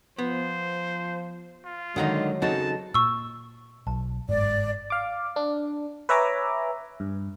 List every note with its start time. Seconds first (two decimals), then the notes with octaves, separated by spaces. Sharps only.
0.18 F3 B3 C5
1.65 F4
1.96 D3 D#3 F#3 G#3 D#4 F#5 A#5
2.42 C#3 C4 D#4 F#4 A4 A5
2.94 A#2 C#6 E6
3.87 B1 A5
4.29 G1 G#2 D5
4.90 F5 D6
5.36 D4
6.09 B4 C#5 E5 G#5 A#5 D6
7.00 G2